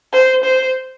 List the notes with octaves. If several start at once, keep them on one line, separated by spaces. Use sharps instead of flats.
C5
C5